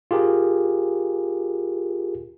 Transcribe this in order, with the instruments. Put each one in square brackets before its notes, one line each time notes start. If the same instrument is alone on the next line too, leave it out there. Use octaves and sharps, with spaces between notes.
[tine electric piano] F4 G4 G#4 A#4